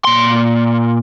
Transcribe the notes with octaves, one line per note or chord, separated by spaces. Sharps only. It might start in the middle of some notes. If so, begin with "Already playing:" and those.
A#2 C6